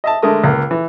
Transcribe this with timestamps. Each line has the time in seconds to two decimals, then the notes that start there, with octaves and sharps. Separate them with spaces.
0.04 D#5 E5 A5
0.22 D3 G#3 A3 A#4 D#6
0.44 C#2 A#3
0.71 E3